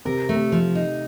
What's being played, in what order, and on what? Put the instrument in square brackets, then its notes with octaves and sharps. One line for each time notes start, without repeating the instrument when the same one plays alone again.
[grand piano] C3 [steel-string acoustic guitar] A#4
[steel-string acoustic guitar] A3
[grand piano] C3
[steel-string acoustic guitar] F3
D#4